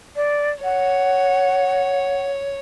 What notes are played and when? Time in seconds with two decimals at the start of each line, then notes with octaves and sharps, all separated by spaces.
0.16 D5
0.64 C#5 F#5